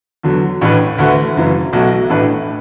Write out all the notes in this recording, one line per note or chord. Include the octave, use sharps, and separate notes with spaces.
E2 D3 F#3
A1 A2 E3 D4 B4
D2 D3 A3 F#4 B4
F#1 F#2 E3
B1 B2 A3 F#4
A1 A2 A3 D4 B4